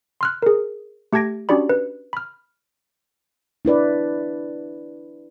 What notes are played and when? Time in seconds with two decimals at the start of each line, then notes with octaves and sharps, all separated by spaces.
0.21 C6 F6 F#6
0.42 G#4 A#4
1.13 A3 G4 A5 G#6 A#6 D7
1.49 C#4 D4 F#4 G4 D5 B5
1.69 B4
2.13 B5 F6
3.65 D4 E4 B4 D5